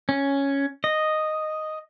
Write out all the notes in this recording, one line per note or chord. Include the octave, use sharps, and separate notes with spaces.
C#4
D#5